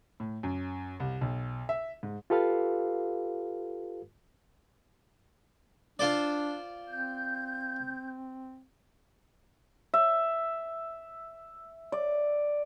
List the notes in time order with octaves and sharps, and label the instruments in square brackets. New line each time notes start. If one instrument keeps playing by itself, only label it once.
[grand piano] A2
F#2
C2
B1
E5
G#2
[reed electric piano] F4 G4 A4 B4 F5
[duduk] D4 [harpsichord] F4 C5 D5
[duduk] C4 [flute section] G6
[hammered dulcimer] E5
D5